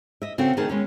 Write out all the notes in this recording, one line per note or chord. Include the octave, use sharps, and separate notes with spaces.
D#5 E5
C#3 C4 F#4 A4 G5
D#3 A3 D#4 G#4 A#4 A5
G#3 B3 C#4